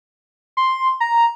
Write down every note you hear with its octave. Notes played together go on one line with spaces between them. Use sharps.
C6
A#5